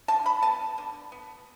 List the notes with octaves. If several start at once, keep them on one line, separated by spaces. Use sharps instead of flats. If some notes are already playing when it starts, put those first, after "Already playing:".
D3 A5
B5
B3 A5
D3
B3